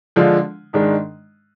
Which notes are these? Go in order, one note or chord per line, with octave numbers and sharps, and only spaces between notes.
D3 F3 G#3 D4 F4
G#2 D#3 G#3 D4